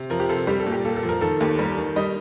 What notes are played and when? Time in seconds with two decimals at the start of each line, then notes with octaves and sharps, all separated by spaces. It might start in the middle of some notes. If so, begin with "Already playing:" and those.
Already playing: C3
0.10 F3 A#4
0.20 G4
0.29 C3 A4
0.47 G3 G4
0.60 A4
0.66 A#2
0.72 G4
0.85 A#3 A4
0.96 A4
1.03 F3
1.09 A#4
1.21 D#3 A4
1.41 D#2
1.59 G3 A#4
1.78 D#3
1.96 G3 D#5